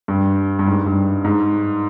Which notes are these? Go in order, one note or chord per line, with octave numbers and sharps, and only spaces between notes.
G2
G2
G#2
G2
G#2